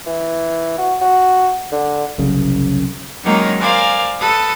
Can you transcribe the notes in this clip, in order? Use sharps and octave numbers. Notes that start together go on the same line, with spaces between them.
E3
F#4
F#4
D3
F#1 C2 F#2 C#3
D#3 F#3 G#3 A#3 C#4 D#4
A#4 C5 D5 F5 G#5
A4 B4 A5 D#6